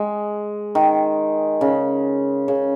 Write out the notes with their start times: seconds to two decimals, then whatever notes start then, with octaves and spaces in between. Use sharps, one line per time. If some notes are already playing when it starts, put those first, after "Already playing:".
Already playing: G#3
0.75 D#3
1.61 C#3
2.48 C#3